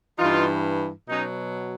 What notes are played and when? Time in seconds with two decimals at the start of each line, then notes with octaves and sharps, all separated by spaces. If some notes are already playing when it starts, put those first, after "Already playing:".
0.18 G2 E3 D#4 F4
1.08 B2 F#3 C#4 D#4